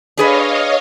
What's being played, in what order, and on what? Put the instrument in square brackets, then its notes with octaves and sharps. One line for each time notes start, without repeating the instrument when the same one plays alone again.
[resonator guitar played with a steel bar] D4 G#4 B4 [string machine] C#5 D#5 F5